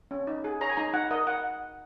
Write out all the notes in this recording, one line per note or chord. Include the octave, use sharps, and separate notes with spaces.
C#4
D#4
G#4
C#5 A#5
G#5
D#4 A#5
D#4 F#5
A#4 D#5
F#5